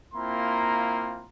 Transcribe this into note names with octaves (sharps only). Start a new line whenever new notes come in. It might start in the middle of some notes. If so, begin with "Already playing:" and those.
A#3 C4 E4 F4 A#5 C6